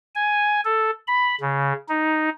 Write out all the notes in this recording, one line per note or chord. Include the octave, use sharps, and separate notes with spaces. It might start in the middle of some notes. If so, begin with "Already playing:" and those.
G#5
A4
B5
C#3
D#4